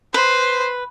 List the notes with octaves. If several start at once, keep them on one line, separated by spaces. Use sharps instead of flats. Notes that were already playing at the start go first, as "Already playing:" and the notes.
B4 C5